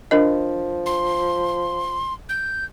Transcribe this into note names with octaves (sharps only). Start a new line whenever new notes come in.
F3 D4 A#4 D#5
C6
G6